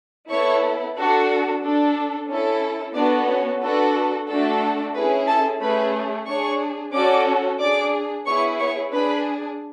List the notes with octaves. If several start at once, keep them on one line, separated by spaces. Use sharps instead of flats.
B3 E4 A4 C#5 C#6
D4 F#4 A4
D4 A4
C#4 E4 A4
B3 D4 F#4 A4 D5
C#4 C#5
D4 F#4 A4 B4
A3 D4 F#4 A4
C#4 E4 G#4 B4
A4 A5
A3 C#4 G#4 B4 B5
D4 G#4 C#5 C#6
C#4 F#4 A4 D5 D6
D4 G#4 D5 D6
B3 E4 G#4 C#5 C#6
C#5 C#6
D4 G#4 B4 B5